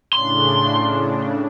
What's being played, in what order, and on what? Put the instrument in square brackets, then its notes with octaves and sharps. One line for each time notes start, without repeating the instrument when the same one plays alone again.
[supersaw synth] A2 C#3 D4 [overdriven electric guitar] C6